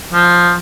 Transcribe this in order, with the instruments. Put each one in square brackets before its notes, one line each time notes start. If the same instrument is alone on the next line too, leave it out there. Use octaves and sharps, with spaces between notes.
[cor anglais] F3